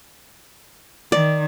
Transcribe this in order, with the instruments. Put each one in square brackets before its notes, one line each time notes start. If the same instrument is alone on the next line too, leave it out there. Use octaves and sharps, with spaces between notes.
[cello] D#3 [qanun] D5